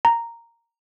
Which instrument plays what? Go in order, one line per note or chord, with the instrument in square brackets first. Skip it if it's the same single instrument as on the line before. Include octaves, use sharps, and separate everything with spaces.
[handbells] A#5